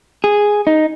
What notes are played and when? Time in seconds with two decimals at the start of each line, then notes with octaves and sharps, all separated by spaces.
0.24 G#4
0.67 D#4